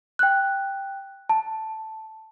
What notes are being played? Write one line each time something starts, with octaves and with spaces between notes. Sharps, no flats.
G5 F#6
A5